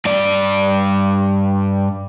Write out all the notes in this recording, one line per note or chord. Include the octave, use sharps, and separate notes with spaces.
G2 D5